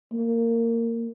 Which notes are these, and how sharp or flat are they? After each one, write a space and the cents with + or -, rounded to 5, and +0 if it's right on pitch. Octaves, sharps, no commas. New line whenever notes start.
A#3 -20